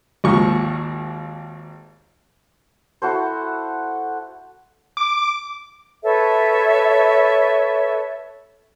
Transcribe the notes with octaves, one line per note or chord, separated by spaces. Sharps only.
G#1 D#2 F3 C#6
E4 F#4 A4 C5
D6
A4 B4 C#5 E5